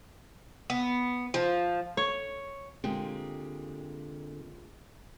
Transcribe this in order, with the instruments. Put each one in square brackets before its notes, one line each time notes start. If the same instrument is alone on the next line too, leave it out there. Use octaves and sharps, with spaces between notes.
[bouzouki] B3
F3
[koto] C#5
[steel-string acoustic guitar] A#2 G#3 G4 [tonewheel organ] D3 [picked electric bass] C4